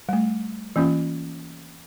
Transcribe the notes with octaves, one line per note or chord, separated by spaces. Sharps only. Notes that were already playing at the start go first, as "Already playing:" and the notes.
G3 A3
E3 A#3 C#4 F4